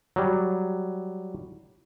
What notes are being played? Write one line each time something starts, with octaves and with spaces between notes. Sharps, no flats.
F#3 G3